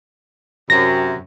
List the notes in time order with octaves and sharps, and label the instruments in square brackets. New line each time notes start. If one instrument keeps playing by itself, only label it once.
[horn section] F#2 C3 [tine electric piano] A#6